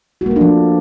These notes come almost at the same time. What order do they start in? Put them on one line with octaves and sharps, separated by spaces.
F#4 A#3 A3 D4 F3